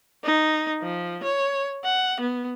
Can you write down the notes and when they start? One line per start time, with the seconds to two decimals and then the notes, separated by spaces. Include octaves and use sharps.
0.24 D#4
0.82 F3
1.23 C#5
1.84 F#5
2.20 B3